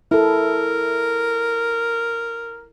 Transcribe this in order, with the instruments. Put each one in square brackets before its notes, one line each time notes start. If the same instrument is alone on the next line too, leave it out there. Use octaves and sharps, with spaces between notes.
[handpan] E4 A4 [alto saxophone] A#4